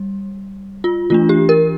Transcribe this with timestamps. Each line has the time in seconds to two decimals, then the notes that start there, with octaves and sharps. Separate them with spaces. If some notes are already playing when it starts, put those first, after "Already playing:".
Already playing: G3
0.84 F4
1.10 E3 A3 D4 F4
1.29 G4
1.49 A#4